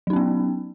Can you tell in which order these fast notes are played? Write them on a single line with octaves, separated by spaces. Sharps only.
F#3 D#4 C#4 B3